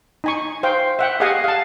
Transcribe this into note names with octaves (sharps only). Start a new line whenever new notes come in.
D#4 G#5 C#6
C5 F5 G5
E5 F#5 G5
G4 G#4 D#5 F5 F#5 G#5
F5 A5